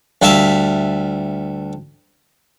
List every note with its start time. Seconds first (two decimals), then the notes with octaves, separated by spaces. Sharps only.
0.22 D2 G3 E5 F5